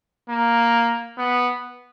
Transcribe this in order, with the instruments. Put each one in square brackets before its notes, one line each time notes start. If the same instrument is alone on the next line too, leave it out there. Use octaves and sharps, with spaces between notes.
[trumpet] A#3
B3